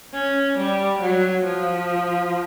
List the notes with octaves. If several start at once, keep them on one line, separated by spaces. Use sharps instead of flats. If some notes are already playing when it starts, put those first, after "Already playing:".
C#4
G3
F#3
F3